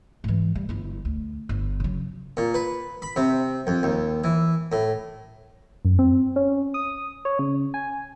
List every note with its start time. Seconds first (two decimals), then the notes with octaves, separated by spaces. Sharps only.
0.24 G#2 E3
0.55 G3
0.69 G1 E4
1.05 D2
1.49 G1
1.80 C#3 F#3
2.37 A#2
2.54 B4
3.02 B5
3.16 C3
3.67 F2
3.83 D#2
4.24 E3
4.72 A2
5.85 F#2
5.99 C4
6.36 C#4
6.74 D#6
7.25 C#5
7.39 C#3
7.74 G#5